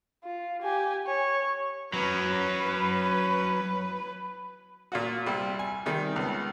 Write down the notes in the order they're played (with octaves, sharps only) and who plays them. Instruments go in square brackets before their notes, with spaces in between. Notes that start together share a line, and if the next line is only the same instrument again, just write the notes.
[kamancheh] F4
G4 G#5
C#5
[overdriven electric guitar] F#3 C#4 [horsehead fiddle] B4
[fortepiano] A#2 F4 F#4
C2 G3
G#5
C3 D#3 G3
C#2 B3